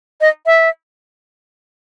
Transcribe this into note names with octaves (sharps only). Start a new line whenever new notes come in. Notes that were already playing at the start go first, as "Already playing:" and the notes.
D#5
E5